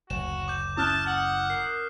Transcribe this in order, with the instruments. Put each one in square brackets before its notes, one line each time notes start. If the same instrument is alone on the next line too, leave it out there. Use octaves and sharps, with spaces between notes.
[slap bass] F#1 [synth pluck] D2 [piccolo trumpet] F#4 [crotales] E7
[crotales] D6 G6
[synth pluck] C#4 E4 [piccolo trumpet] A5 [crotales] D#6 F6 F#6
[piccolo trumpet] F#5
[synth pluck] A#4 [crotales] C7